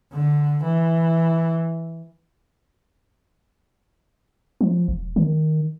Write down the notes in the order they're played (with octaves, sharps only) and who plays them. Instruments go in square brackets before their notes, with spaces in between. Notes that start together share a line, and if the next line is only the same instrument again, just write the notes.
[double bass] D3
E3
[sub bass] F3
E1
D#3